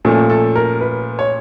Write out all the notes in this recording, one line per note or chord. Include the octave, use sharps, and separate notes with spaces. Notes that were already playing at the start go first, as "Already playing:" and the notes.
A#2 F3 A3 C#4 A4
A4
A#4
B4
C#5